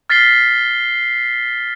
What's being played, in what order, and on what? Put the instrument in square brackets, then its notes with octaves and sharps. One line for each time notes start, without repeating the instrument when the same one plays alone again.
[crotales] F6 A6 B6 C7 G7